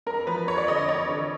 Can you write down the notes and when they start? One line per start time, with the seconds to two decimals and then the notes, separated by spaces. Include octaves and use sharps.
0.07 F2 A#4
0.27 F3 B4
0.47 F2 C#5
0.58 D5
0.68 D3 D#5
0.79 D5
0.88 F2 C#5
1.09 D3